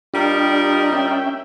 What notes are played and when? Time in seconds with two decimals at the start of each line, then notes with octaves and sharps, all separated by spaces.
0.14 G3 D4 F4 G4 A#4 D#5
0.93 C#4 E5 G5